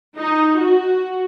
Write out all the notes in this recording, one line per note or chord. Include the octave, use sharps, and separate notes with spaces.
D#4
F#4